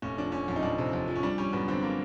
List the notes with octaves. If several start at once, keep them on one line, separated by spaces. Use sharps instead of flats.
F1 C#4
F3 D4
F1 C#4
F2 C#4
D#4
F2 D4
C3
F2
F3
C#4
G3 D4
G3 C#4
F#2 B3
D3 C4
A#3